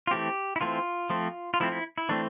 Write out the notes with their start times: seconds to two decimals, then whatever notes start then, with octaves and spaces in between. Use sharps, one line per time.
0.07 F4
0.11 E3 A3 C4 G4
0.56 E4
0.61 E3 A3 C4 F4
1.10 F3 A3 C4
1.54 F4
1.60 F3 A3 C4 E4
1.72 E4
1.98 E4
2.09 E3 A3 C4 D4